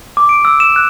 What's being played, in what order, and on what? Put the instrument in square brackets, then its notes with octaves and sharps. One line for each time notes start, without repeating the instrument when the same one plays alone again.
[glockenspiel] D6
D7
E6
E7
F#6